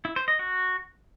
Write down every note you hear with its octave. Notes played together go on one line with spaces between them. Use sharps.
E4
C5
D#5
F#4